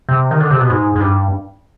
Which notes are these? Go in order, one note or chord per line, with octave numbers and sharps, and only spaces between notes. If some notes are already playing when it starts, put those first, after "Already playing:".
C3
D#3
D3
C3
B2
G#2
G#2
G2